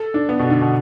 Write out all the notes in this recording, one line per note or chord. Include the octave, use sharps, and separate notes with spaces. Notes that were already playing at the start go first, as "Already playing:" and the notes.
Already playing: A4
D4
B3
B2
D3
B2